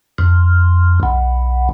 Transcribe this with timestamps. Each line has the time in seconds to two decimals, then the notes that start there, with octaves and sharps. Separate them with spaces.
0.18 F2
1.03 B1